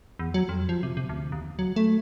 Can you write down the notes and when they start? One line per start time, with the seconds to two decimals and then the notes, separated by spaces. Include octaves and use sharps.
0.19 E2
0.34 F#3
0.49 F2
0.69 F3
0.83 C3
0.97 C3
1.09 D2
1.32 D#2
1.59 F#3
1.76 A3